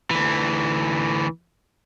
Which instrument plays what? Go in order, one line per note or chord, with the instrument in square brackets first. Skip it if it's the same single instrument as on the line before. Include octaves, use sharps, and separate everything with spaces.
[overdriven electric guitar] D2 E3